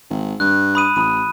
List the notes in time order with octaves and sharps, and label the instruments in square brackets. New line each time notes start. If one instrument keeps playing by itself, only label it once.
[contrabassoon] G#1
[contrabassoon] G2 [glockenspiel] F#6
[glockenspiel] B5 D#6 D#7
[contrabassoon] A1 [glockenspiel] B5 D#6 D#7